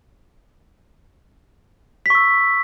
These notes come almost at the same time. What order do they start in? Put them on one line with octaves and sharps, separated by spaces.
B6 C#6 E6